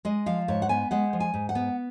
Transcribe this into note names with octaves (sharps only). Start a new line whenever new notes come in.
G#3 D#5
F3 F5
G#2 C#5
F#5
B3 G#5
G#3 F#5
F3
G#5
G#2
F#5
B3